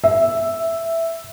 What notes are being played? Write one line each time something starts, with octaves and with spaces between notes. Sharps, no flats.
E5